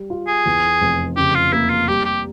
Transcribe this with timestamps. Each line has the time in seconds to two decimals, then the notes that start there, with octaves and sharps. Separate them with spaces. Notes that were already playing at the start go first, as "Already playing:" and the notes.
Already playing: G3
0.10 F4
0.28 G#4
0.46 E2
0.81 F1
1.17 C#3 G4
1.35 F4
1.53 A#3 E4
1.70 F4
1.88 G3 G4
2.05 G4